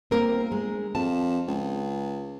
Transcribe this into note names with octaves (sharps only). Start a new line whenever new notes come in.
G1 A#3 C4 A#4
G#3
F2 A5
C#2